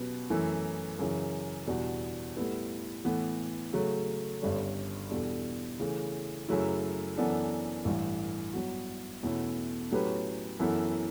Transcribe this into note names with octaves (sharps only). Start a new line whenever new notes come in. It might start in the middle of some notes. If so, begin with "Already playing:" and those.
Already playing: B2 F#3 C#4 G4 B4
F#2 E3 A3 E4
F#2 C#3 E3
E2 B2 G3 D4 F#4
A2 G3 B3 E4 B4
A2 E3 B3
C#3 F#3 A3
G1 G2 D3 G3 C#4
E2 B2 G3 D4 A4
C#3 E3 A3
F#2 C#3 F#3 A3 E4
F#2 E3 B3 D4 A4
A1 G2 E3
G2 F#3 B3 F#4
E2 B2 A3 C#4 E4
A2 F#3 C#4 G4 B4
F#2 E3 B3 E4 A4